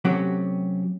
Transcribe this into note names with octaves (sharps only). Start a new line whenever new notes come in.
C3 F#3 A3 C#4 F#4 G4